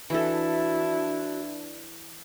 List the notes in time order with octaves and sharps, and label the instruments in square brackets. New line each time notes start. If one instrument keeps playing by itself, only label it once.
[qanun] E3 A4 [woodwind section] D4 [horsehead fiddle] E4 [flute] F#4